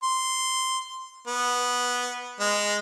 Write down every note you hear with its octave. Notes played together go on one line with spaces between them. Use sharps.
C6
B3
G#3